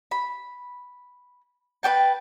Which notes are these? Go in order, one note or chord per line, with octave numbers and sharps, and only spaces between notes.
B5
B4 C#5 G5 A5